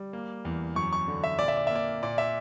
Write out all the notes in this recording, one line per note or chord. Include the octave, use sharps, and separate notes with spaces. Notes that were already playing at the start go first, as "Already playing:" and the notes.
Already playing: G3
A#3
E2
F#2 C#6
C#6
D3
E5
A#2 D5
E5
D5
A#3 E5
D5
A#2 D5
E5